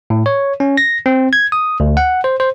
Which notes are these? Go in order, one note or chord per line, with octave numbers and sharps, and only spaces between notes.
A2
C#5
C#4
A#6
C4
G#6
D#6
D2
F#5
C5
C5